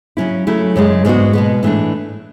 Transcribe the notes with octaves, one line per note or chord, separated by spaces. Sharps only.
C#3 F#3 C#4 E4
C#3 F#3 A3 E4
F#2 C#3 G#3
G#2 G#3 B3 D4 F#4
B2 G#3 B3
A2 E3 A3 D4